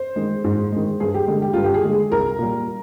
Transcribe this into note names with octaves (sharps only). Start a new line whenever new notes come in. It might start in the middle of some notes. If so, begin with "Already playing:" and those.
Already playing: C5
D#3 G#3
G#2
D#3 G#3
G2 G#4
G4
D3 G#3
G4
G2 F4
G4
G#4
D3 G#3
G#4
C2 A#4
A#2 G3